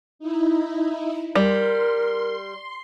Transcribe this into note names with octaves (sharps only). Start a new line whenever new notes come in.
D#4 E4
G3 A#4 C6